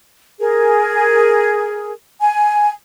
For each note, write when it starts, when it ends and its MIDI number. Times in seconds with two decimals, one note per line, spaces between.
0.40 1.91 68
0.40 1.91 70
2.20 2.70 80